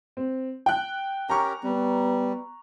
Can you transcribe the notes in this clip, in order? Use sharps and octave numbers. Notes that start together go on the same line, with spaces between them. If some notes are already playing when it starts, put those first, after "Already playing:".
C4
G5 F#6
C#4 G4 A#4 A#5 C#6
G3 B3